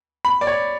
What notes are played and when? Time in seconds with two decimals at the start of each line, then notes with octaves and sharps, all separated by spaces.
0.25 B5
0.41 D5
0.47 C#5